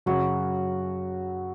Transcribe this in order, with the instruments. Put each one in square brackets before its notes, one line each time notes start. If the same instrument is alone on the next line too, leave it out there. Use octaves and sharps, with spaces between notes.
[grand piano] F#2 C#3 F#3 C#4 [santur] F#4